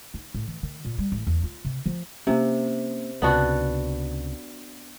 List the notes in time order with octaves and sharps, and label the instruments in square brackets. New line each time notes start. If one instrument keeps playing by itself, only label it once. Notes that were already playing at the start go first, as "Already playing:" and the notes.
[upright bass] D#4
A2
E3
D#3
A#2
G3
A1
E2
F4
C3
F3
[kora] C3 [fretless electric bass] A#3 B3 C#4
[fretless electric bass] C#2 C3 [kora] B3 D4 F#4